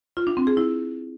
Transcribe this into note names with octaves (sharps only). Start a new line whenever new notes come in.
F4
D4
C4
G#4
E4